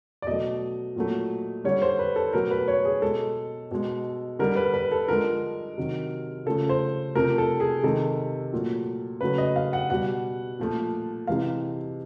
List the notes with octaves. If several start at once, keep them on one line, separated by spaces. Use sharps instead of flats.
D5
B2 F#3 A3 D#5
A#2 F#3 A3
D3 G3 C#5
C5
B4
A4
B2 F#3 A3 A#4
B4
C#5
G#4
B2 G#3 A4
B2 G#3
D3 G3 A#4
B4
B4
A4
D3 F3 G#3 A#4
C3 D#3 F#3
C#3 F3 A3 A4
C5
C3 F3 A3 A#4
A4
G#4
C3 D#3 G#3 A4
A#2 F#3 A3
C#3 F#3 A3 B4
D#5
F5
F#5
B2 G3 F#5
A#2 F3 A3
C3 E3 G#3 F5